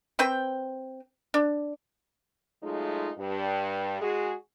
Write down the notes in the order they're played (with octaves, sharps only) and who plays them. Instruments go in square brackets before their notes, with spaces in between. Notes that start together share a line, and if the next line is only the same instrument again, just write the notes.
[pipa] C4 B4 C5 G5
D4
[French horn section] F#3 G#3 A3 D#4 F4
G2
G#3 F#4 G#4